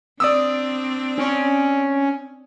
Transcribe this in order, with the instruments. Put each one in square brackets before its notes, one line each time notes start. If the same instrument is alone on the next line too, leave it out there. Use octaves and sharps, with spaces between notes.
[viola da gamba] C4 D4 [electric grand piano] D5 D#6 E6
[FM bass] C#4